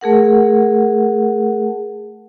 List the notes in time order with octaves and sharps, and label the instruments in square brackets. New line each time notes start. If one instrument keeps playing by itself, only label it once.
[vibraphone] A3 G#4 A#4 F#5